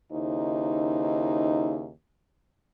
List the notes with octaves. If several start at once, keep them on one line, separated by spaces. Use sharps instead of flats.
D#2 C#3 D#4 E4 C5